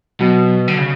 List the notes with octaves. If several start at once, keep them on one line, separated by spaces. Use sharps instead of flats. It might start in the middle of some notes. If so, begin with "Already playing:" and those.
B2 F#3
D3
C#3